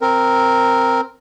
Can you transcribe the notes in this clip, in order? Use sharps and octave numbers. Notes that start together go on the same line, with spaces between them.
C4 A#4